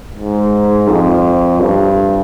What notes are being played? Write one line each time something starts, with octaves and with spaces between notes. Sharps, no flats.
G#2
F2
G2